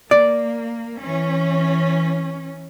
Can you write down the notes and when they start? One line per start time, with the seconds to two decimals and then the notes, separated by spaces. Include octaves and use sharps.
0.11 A#3 D5
1.03 E3 C#4